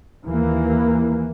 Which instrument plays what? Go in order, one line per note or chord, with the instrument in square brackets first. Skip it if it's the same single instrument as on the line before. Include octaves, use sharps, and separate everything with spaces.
[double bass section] D#2 E3 A#3